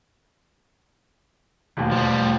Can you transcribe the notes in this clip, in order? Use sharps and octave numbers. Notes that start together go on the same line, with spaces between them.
E1 D#2 A3
F3 G3